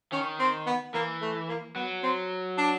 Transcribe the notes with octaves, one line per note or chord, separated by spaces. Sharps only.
D#3 C#4
C4
B3
E3 A#3
A3
A#3
F#3 B3
C4
D4